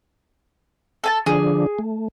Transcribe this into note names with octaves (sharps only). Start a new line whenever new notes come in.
A4 G#5 A5
D3 F3 D4 G#4
A3